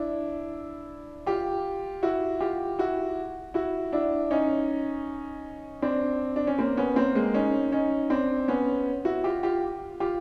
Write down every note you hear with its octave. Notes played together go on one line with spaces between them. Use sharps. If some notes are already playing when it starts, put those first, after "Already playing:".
Already playing: D4 E4
F4 G4
E4 F#4
F4 G4
E4 F#4
E4 F#4
D4 E4
C#4 D#4
C4 D4
D4
C#4
A#3 C4
B3 C#4
A#3 C4
G#3 A#3
C#4 D#4
C#4 D#4
C4 D4
B3 C#4
E4 F#4
F4 G4
F4 G4
F4 G4